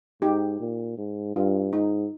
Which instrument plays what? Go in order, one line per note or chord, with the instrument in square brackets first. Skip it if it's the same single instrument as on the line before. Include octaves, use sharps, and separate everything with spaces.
[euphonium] G#2 [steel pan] D#4 G4
[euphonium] A#2
G#2
[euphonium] G2 [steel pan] F4
[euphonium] G#2 [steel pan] D#4